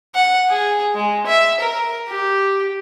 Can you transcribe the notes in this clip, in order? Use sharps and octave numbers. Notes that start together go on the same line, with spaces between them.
F#5
G#4
G#3
E5
A#4
G4